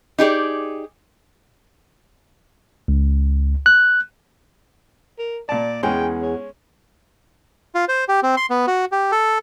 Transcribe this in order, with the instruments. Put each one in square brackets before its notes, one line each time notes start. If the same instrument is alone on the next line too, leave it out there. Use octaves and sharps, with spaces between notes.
[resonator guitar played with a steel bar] D#4 G4 G#4 D5
[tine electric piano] C#2
F#6
[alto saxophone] A#4
[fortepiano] A#2 A5 [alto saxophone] D5
[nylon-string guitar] E2 G#4 [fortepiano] G#3 C#4 [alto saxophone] G5
[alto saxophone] C#5
[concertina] F4
C5
G4
C4
C6
B3
F#4
G4
A4